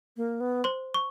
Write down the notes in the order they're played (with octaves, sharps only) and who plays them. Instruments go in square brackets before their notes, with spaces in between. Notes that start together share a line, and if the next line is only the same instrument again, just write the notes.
[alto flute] A#3
B3
[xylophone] C5 C6
C#6